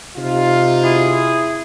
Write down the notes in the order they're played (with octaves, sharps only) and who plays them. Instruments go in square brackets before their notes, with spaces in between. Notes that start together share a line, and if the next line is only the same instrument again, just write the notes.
[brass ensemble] C3 D#4 F4
[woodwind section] E4 G#4